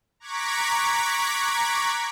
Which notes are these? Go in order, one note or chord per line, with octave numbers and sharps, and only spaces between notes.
A#5 C#6 D6 F#6 G#6 B6